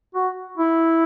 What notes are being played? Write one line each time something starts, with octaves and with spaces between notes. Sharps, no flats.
F#4
E4